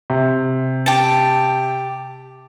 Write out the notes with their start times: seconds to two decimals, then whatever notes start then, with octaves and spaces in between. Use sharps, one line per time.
0.10 C3
0.86 G4 A5